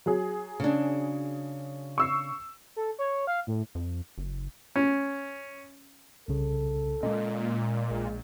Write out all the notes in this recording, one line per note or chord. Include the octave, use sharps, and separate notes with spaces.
F#3 G#4
C#3 D4
C#6 E6 C7
A4
C#5
F5
A2
F2
F#1
C#4
C2 C#3 A4
A#2 G#3 C#4 D#5
A#1 G#3